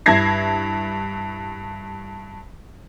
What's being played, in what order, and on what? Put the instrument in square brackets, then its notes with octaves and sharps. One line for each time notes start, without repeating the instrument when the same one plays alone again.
[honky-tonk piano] G2 E4 A5 G#6 A#6 C7